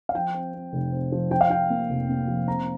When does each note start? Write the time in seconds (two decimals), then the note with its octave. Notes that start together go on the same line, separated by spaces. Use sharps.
0.09 F5
0.15 F3 G5
0.34 C4
0.54 C4
0.73 F1
0.93 C4
1.12 F3
1.31 F3 G5
1.41 F5
1.50 F3 G5
1.70 A#3
1.90 F1
2.09 A#3
2.28 F3
2.48 C4 A#5